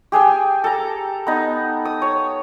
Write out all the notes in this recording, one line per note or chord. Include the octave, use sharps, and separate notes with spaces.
G4 G#4 G5 G#5
A4 A#5
B3 D#4
D#6
C#5